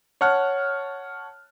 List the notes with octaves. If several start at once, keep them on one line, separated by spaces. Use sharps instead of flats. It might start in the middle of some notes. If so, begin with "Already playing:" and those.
C#5 F#5 A5 F6 F#6